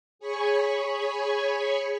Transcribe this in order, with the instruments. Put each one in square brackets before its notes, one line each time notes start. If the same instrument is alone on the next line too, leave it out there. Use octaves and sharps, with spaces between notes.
[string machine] G#4 C#5 G#5 B5 C#6